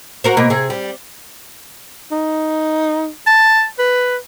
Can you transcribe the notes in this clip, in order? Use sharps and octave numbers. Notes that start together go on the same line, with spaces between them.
F#4 A#4 C5
B2 A#3
C3 G#4
G3
D#4
A5
B4